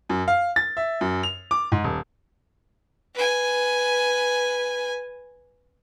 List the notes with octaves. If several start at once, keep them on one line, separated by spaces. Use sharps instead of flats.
F#2
F5
A6
E5
F#2
F7
D6
G#2
D#1
B4 G#5